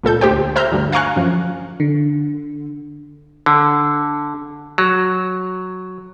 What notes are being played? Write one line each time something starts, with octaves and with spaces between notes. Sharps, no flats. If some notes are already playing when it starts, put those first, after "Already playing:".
C#2 A#2 A4 G6
D2 G4 C5 G5
C5 E5 A#5 F6 G6
D2 G2
F5 G#5 A#5 C#6 F6 F#6
F#2 F3
D3
D3
F#3